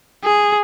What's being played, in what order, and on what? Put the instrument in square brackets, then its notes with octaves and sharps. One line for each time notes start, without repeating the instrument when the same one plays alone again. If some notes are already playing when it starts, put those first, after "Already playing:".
[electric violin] G#4